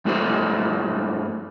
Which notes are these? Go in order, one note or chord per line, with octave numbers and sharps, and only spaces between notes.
G2 A3 E4 F#4 A4 C5